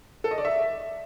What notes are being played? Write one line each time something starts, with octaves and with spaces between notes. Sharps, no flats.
A4
D#5
D5
E5